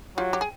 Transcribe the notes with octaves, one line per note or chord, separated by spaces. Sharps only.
F#3 F4 G4
G4
G#4